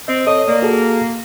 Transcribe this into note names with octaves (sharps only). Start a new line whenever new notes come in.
C4 D#5
A4 C#5 D#5
A#3 D5
F#4 G#4 A4